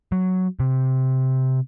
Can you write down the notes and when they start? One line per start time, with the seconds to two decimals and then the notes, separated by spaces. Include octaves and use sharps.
0.12 F#3
0.60 C3